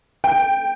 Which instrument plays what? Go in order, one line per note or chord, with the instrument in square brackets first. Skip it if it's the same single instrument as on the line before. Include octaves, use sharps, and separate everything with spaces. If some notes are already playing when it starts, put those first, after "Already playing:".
[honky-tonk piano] G5